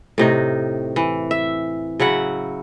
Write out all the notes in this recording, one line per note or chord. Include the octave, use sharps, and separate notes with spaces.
A2 C3 D#4
E3
E5
C#3 F#3 E4 F#5